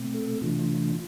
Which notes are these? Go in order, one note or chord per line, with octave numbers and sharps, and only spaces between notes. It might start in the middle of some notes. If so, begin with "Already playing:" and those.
Already playing: B2 A3 C4
A4
C3 E3 A3 D4 F4